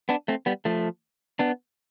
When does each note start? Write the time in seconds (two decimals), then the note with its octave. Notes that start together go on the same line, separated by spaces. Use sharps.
0.09 B3 D4
0.28 A3 C4
0.46 G3 B3
0.65 F3 A3
1.39 B3 D4